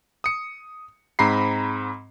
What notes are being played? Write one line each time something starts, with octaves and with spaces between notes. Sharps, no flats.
D#6 C#7
G#2 C4 A#5 B5 C7